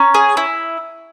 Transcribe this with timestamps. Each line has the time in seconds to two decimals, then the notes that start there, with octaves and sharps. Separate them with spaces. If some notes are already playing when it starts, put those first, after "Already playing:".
Already playing: C#4 A#5
0.14 G#4
0.37 E4